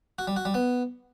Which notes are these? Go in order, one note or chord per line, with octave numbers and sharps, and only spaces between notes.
F#4
G3
F#4
G3
B3